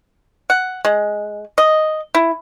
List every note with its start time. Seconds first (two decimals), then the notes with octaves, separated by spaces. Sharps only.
0.50 F#5
0.85 G#3
1.58 D#5
2.15 E4